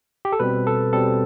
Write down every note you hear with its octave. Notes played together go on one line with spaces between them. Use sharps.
G4
A4
B2 G3 C4 B4
A4
B2 G3 C4 A4